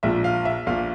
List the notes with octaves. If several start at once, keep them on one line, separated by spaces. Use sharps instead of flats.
A#1 A#2 F3 E5
F5
E5
A#1 A#2 F3 F5